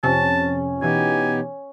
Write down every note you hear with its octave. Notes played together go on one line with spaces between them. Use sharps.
F2 C3 C#4 A5
B2 E3 B3 D#4 G4 G#5